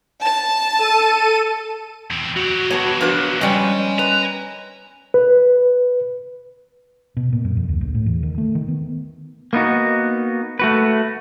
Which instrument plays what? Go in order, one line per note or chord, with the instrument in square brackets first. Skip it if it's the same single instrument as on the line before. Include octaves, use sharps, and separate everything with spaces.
[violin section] A5
[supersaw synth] A4 D#7
[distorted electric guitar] E2 C4
[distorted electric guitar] F#3 G4 [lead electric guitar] F#4
[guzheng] B3 [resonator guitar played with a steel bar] C#5 A5
[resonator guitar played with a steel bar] F3 D4 B4
[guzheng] G3 C#4 [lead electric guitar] D#5 G#5
[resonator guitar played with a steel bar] B4 [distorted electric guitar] A#5
[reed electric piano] B4
[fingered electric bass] B2
A#2
F#2
F2
D2
A#1
A2
E2
D#3
A3
D#3
B3
[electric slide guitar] A#3 B3 D#4 F#4
A3 F#4 B4